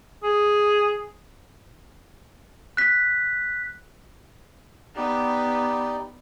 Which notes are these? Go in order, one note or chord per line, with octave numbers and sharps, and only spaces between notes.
G#4
F#6 B6
B3 D#4 G4 D5